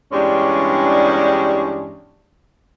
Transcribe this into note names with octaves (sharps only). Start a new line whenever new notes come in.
E2 G2 G3 G#3 C#4 D4